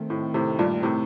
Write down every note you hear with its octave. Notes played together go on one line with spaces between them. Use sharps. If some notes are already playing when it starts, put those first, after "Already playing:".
Already playing: D#3 A3 C4
A2
A2 C3
G2 A#2
A2 C3